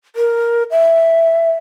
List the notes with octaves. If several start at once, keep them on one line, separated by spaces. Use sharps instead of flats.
A#4
E5